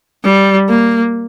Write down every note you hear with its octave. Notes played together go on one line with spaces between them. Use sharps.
G3
A#3